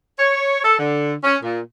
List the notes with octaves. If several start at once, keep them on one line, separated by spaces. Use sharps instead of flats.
C#5
A4
D3
C#4
A#2